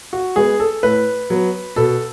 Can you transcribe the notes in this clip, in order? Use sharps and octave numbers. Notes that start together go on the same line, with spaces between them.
F#4
G#3 B3 G#4
A4
A2 B4
F#3 B3
B2 A4